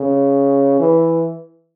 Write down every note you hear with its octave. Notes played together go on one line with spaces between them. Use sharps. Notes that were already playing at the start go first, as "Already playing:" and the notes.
Already playing: C#3
E3